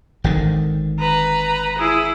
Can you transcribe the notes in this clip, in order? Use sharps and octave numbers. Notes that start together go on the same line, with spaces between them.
G#1 D3 D#3
B4 A#5
E4 G#4